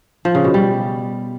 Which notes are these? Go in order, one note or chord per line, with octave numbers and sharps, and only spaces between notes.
F3
C#3
B2
G3